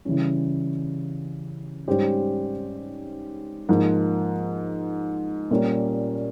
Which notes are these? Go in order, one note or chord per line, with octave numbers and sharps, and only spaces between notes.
C#3 E3 G3 C#4
G#2 G3 C#4 G4 C5
G#2 F3 A#3
A#2 G3 C#4